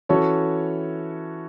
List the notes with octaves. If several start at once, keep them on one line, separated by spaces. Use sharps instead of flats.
E3 C#4 F#4 A4 C#5